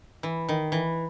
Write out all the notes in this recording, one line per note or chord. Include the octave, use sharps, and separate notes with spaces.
E3
D#3
E3